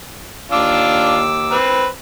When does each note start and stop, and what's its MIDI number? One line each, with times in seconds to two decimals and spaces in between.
0.52 1.57 39
0.52 1.22 62
0.52 1.22 65
0.52 1.57 86
0.52 1.57 88
1.52 1.87 60
1.52 1.87 71